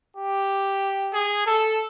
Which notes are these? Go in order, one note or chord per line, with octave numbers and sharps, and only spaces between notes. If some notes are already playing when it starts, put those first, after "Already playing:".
G4
G#4
A4